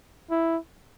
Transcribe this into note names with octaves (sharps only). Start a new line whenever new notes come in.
E4